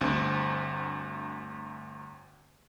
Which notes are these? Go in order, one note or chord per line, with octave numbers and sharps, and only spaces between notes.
G1 D2 C4